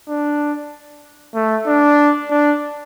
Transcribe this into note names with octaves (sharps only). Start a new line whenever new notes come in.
D4
A3
D4
D4